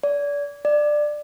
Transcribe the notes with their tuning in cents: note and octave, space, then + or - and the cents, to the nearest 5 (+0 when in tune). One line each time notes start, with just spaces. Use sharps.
D5 -30
D5 +15